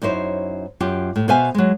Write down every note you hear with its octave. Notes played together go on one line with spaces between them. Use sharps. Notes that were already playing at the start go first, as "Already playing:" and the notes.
F#2 D#4 E4 C5 C#5
F#2 F4 G4
A2
B2 B3 C5 E5 F5 G#5
F#3 G#3